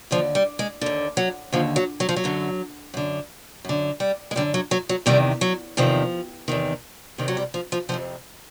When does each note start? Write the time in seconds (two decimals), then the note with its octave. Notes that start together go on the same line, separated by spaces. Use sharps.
0.11 D#2 D3 F3
0.35 G3
0.59 G#3
0.81 D#2 D3
1.17 F#3
1.52 D#2 D3 F3
1.76 F#3
2.00 F#3
2.09 F3
2.16 F#3
2.24 F#2 D3
2.94 F#2 D3
3.65 F#2 D3
4.00 G3
4.31 G#3
4.36 F#2 D3 G3
4.54 F#3
4.71 F#3
4.89 F#3
5.06 E2 C3 D#3 G3
5.41 F#3
5.77 E2 C3 D#3 F3
6.48 E2 C3 D#3
7.18 E2 C3 D#3
7.28 F#3
7.37 G3
7.54 F3
7.72 F3
7.89 F2 C3 D#3 F3